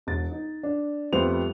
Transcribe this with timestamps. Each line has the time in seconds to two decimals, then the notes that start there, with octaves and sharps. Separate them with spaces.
0.07 E1 A6
0.31 D#4
0.63 D4
1.13 F2 G3 A3 B3 C5 F7